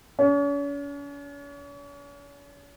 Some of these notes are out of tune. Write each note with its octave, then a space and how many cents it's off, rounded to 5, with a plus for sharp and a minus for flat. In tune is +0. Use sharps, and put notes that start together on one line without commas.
C#4 +40